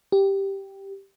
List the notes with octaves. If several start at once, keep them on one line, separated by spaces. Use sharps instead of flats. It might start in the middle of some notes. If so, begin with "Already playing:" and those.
G4